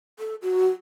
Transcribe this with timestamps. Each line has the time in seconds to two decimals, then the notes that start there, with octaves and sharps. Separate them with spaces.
0.19 A4
0.42 F#4